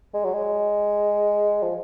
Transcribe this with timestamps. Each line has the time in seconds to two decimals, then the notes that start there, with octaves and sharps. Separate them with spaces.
0.14 G#3
0.25 F#3
0.34 G#3
1.63 F3